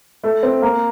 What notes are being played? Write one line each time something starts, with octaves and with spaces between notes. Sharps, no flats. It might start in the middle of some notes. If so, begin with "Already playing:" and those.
A3
C4
A#3